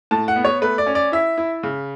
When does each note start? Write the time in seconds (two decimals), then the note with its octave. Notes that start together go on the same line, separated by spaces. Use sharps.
0.11 A2 A5
0.28 F#5
0.36 B3
0.45 C#5
0.62 A3 B4
0.78 D5
0.86 C#4
0.95 D5
1.12 E4 E5
1.38 E4
1.63 C#3